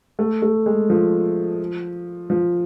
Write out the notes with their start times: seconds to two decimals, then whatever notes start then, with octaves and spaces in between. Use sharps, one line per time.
0.19 A3
0.42 A3
0.66 G#3
0.90 F3
2.30 F3